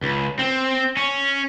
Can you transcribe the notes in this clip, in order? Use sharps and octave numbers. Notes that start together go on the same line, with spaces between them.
C#2
C4
C#4